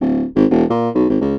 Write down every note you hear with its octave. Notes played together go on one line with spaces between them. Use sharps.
D1
G#1
E1
A#2
B1
G#1
C#2